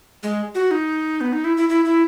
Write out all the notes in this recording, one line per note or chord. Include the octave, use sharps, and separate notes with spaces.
G#3
F#4
D#4
B3
D#4
E4
E4
E4
E4